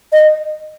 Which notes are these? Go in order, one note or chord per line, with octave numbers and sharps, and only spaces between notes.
D#5